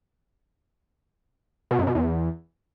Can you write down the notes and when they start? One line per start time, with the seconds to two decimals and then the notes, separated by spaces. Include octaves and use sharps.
1.71 B2
1.79 F#2
1.87 B2
1.95 E2